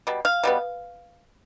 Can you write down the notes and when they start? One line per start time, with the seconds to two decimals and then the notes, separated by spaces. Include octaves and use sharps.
0.07 B2 G3
0.25 F5
0.43 B2 G3 B3